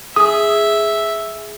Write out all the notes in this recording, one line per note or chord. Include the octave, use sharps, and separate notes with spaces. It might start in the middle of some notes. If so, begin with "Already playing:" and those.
G#4 E5 D#6